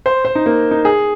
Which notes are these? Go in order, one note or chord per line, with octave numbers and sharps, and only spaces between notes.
C5
C5
D#4
A#3
D#4
G#4